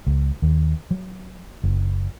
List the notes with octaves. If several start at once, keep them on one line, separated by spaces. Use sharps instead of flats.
C#2
D#2
F#3
F#1